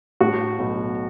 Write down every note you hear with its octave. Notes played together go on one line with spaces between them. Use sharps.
A2 F#4
B1